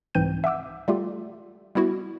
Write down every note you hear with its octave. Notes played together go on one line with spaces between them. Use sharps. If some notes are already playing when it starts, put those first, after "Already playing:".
C2 G#2 E3 C4 G6 D#7
E5 F#5 D6 E6
G3 A3 F4 G4
G3 B3 E4 F#4